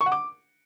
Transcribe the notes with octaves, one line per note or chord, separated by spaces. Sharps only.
C#6
F#5
D6